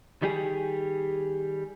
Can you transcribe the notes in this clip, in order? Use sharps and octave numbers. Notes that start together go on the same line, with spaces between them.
D#3 G3 G4 G#4